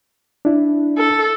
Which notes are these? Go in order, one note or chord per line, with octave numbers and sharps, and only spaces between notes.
D4 E4
A4